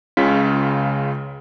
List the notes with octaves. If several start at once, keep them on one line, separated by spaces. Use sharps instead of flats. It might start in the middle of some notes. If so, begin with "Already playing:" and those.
C#2 C#3 F4 F6 B6